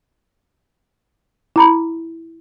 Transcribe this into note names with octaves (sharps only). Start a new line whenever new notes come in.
E4 A#5 B5